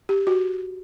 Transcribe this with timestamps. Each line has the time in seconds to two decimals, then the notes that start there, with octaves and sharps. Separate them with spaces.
0.09 G4
0.27 F#4